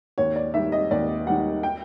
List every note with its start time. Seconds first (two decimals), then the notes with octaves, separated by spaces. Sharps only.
0.18 D#2 C#5
0.36 D5
0.54 D#3 G3 E5
0.72 D#5
0.91 D#2 D5
1.27 D#3 G3 F#5
1.63 G5